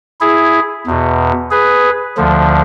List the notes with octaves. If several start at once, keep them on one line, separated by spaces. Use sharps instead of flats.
E4 G#4
E2 B2
G#4 B4
D2 D3 F3